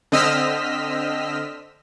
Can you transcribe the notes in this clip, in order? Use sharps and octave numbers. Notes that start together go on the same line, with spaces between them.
D3 C4 D#5 E6 F6 B6